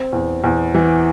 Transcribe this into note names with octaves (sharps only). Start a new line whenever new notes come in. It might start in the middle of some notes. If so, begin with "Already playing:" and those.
Already playing: C4
E2
E2
E3